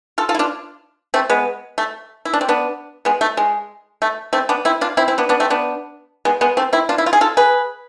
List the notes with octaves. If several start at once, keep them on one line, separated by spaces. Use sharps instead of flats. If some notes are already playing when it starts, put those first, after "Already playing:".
F4 A4
F4 A4
E4
D4 F4
A3 C4
G#3 B3
A3
E4
D4
C4
B3 D4
G#3 B3
A3
G#3
A3
A3 C4
B3 D4
C4 E4
D4 F4
C4 E4
C4 E4
B3 D4
B3 D4
A3 C4
B3 D4
G#3 B3
G#3 B3
A3 C4
C4 E4
D4 F4
E4
F4
G#4
F4 A4
G#4 B4